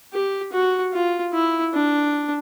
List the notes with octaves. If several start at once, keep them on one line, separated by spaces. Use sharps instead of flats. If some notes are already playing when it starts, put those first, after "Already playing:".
G4
F#4
F4
E4
D4